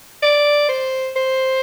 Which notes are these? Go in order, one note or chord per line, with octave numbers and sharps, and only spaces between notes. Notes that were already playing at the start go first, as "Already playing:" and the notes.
D5
C5
C5